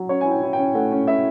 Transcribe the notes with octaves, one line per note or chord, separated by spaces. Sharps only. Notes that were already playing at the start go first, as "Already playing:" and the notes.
Already playing: F#3
C#4 C#5
E4 G#5
G5
E4
G5
C#4
A3 F#5
C#4
E4 E5